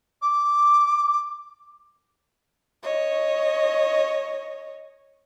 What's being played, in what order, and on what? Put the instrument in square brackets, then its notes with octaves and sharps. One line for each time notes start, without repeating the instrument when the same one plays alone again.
[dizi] D6
[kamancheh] C#5 D#5